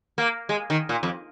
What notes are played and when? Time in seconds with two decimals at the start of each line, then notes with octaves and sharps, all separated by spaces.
0.18 A#3
0.49 G#3
0.70 D#3
0.89 A#2
1.03 F2